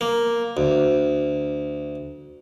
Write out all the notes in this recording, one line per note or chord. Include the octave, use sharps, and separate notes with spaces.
A#3
D2